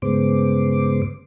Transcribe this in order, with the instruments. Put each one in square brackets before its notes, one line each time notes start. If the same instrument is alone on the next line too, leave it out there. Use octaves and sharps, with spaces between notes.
[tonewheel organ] G2 C#3 G#3 B3 C5 D6